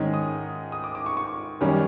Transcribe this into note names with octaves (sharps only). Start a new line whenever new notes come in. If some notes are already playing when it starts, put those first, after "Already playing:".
Already playing: G#2 D#3 G#3 C#4
D#6
D#6
D6
D6
C#6
C#6
F#2 D#3 G3 A#3 C#4